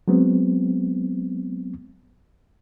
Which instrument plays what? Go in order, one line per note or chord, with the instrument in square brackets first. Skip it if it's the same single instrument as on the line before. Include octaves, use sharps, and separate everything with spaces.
[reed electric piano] F#3 G#3 B3 C4